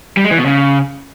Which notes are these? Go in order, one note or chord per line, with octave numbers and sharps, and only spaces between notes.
G3
G#3
E3
B2
C#3